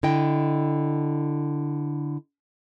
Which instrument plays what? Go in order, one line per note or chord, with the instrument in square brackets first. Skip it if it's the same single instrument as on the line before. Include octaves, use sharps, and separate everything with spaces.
[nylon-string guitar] D3 E4 D#5 G5